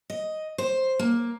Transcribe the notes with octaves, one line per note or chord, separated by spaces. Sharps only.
D#5
C5
A#3